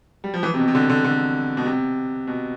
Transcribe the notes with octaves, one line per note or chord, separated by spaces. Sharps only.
G3
F3
E3
C3
B2
C3
D3
D3
D3
B2
C3
B2